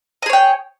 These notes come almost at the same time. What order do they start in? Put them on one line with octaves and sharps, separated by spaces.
D#5 G#4 C#5 G5